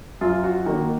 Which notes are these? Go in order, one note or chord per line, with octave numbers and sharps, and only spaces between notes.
F#2 F4
F#4
D#3 A#3 F#4